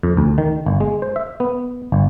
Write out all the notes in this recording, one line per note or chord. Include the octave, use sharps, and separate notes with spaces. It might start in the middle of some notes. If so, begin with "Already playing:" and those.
F2
D2
D#3
G1
G#3
C5
E5
B3
G1